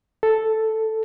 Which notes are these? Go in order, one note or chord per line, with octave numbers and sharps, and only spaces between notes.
A4